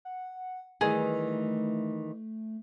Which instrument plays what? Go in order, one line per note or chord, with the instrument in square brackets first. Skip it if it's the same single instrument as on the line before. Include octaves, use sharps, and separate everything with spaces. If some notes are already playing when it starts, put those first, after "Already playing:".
[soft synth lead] F#5
[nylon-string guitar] D#3 E3 G3 [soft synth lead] A3 [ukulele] G#4